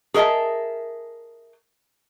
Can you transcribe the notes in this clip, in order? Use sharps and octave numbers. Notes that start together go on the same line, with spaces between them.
G#4 A#4 D#5 E5 A5